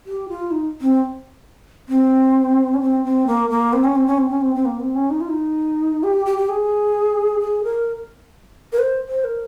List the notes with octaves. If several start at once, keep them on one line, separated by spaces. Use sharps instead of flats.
G4
F4
D#4
C4
C4
C#4
C4
C4
A#3
A#3
C4
C#4
C4
C#4
C4
C#4
C4
C4
A#3
C4
C#4
D#4
F4
D#4
G4
G4
G4
G#4
G#4
A#4
A#4
C5
C5
A#4